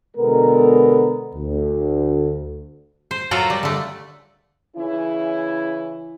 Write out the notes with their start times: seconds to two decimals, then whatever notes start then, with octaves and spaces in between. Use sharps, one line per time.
0.17 B2 D3 G#3 B3 A4 A#4
1.35 D2
3.11 C5
3.31 F#3 F4 F#4 A4 A#4
3.50 G3
3.63 D3 A3
4.76 C#3 E3 C#4 E4